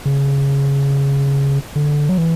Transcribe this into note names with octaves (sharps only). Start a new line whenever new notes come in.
C#3
D3
F#3
E3